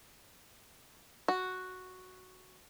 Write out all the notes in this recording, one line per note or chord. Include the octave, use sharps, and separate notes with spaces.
F#4